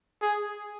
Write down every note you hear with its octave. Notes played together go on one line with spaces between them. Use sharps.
G#4